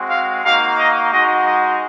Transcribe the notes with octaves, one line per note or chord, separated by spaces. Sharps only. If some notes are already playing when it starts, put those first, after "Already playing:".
Already playing: G#3 C4 F#4
F5
A#3 D#4 F#4 F5
D#5
G#3 D#4 F#4 D#5
D#5